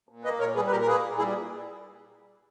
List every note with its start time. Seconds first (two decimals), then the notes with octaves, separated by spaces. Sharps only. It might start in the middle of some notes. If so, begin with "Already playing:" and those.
0.09 A#2
0.24 A#3 B4 D#5
0.39 A#2 A#4 C#5
0.56 G3 G#4 B4
0.67 B4
0.71 A#2 G4 A#4
0.81 A#4
0.87 A#3 G#4 B4
1.02 A#2
1.18 G3 E4 G#4